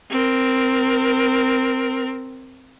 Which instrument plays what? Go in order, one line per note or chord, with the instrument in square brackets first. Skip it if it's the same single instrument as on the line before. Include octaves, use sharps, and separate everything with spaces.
[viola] C4 A#4